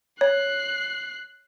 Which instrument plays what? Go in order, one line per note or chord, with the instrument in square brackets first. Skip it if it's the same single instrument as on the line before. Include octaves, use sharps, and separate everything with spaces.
[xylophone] C#5 [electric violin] F#6 C7